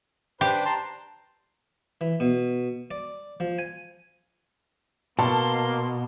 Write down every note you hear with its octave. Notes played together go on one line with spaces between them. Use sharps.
D4 G4 B4 C5
A5 A#5 C6
E3
B2
D5
F3
G#5
B2 A#3 A5 C6